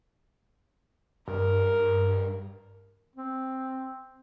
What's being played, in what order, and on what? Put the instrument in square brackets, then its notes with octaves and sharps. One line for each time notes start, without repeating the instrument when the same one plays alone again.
[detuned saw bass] G2 [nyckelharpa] A#4
[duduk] C4